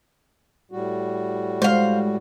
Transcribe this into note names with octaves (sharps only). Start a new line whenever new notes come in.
A2 G3 F#4
G#3 C5 F5